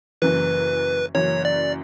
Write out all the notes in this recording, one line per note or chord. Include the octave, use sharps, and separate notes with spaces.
F#1 F#2 E3 B4
F#1 F#2 E3 C#5
D5